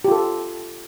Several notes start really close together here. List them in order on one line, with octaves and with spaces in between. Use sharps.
G4 F4 A4